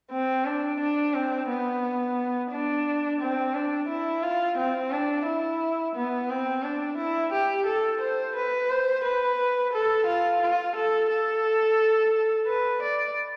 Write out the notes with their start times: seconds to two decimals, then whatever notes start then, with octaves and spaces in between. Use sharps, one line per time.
0.11 C4
0.45 D4
0.80 D4
1.14 C4
1.49 B3
2.51 D4
3.21 C4
3.54 D4
3.88 E4
4.23 F4
4.57 C4
4.91 D4
5.26 E4
5.95 B3
6.30 C4
6.63 D4
6.97 E4
7.32 G4
7.66 A4
8.01 C5
8.36 B4
8.70 C5
9.04 B4
9.73 A4
10.06 F4
10.41 F4
10.76 A4
11.10 A4
12.47 B4
12.82 D5